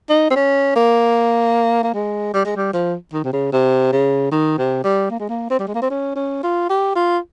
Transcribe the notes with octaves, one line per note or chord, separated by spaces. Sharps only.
D#4
C4
C#4
A#3
A#3
G#3
G3
G#3
G3
F3
D#3
C3
C#3
C3
C#3
D#3
C3
G3
A#3
G#3
A#3
C4
G3
G#3
A#3
C4
C#4
C#4
F4
G4
F4